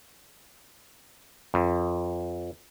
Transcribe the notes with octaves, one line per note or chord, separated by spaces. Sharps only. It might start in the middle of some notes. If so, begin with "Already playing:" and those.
F2